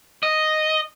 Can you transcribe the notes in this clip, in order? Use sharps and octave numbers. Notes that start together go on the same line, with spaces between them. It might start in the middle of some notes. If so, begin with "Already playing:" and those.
D#5